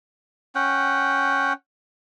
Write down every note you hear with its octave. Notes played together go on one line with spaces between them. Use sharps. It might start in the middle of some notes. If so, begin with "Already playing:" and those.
C#4 F#5 G5